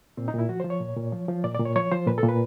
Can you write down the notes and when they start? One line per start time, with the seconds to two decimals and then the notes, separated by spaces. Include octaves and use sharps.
0.17 A#2 C4
0.28 D#4
0.34 A#2 E4
0.49 F3 F#4
0.60 F3 C5
0.70 C#5
0.81 A#2
0.97 A#2
1.12 F3
1.28 F3
1.44 A#2 D5
1.54 D5
1.60 A#2
1.65 C#5
1.76 F3 C#5
1.92 F3 C5
2.07 A#2 B4
2.18 A4
2.23 A#2
2.29 B4